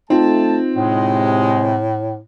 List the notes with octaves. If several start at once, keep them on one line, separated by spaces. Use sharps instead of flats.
A3 C4 D#4 F4 A5
A2 C3 G#3